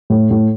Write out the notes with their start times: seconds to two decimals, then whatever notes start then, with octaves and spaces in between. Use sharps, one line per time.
0.10 A2
0.31 A2